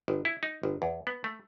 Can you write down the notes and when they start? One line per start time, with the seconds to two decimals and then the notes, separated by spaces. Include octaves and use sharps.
0.08 G1
0.25 E4
0.43 D#4
0.63 G1
0.82 E2
1.07 B3
1.24 A3